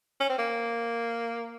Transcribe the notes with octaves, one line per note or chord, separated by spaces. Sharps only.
C#4
C4
A#3